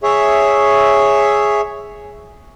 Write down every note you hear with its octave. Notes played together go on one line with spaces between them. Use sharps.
G#4 C#5 E5